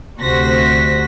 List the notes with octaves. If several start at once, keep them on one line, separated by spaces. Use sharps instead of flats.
D2 C3 F#4 C5 A#6 B6